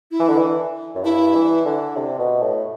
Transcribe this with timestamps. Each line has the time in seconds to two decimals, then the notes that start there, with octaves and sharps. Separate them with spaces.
0.11 E4
0.20 E3
0.29 D3
0.38 E3
0.95 F#2
1.04 G2 E4
1.35 E3
1.65 D3
1.96 C3
2.19 B2
2.42 A2